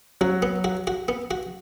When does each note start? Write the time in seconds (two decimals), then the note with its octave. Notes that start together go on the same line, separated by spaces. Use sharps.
0.21 F#3 F#4
0.42 B3
0.64 F#4
0.87 F#4
1.08 B3
1.31 F#4